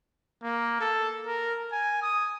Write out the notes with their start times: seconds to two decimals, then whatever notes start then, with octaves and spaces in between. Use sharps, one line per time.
0.43 A#3
0.80 A4
1.26 A#4
1.72 G#5
2.02 D#6